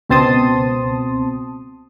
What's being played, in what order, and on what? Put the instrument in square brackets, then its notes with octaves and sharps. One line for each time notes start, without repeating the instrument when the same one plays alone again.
[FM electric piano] C#2 B2 C4 A5 C6 D#6